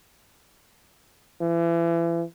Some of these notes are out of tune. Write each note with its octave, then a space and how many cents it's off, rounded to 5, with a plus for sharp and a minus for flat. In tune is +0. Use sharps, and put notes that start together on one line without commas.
E3 +35